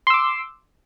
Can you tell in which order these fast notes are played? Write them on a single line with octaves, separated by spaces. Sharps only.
C6 E6 D6